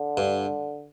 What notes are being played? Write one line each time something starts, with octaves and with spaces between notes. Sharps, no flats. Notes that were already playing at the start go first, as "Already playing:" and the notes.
Already playing: D3
G2